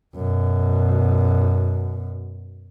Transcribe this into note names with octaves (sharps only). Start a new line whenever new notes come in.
F#2 B2